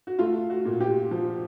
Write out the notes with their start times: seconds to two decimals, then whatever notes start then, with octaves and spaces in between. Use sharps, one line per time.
0.07 F#4
0.19 A3 F4
0.50 F#4
0.65 A#2
0.80 G4
1.11 F3